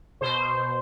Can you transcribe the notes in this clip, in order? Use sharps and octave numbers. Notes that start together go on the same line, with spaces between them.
B2 C5
B2
B2